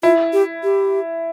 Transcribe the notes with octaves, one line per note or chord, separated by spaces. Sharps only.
E4 F4
G4
G4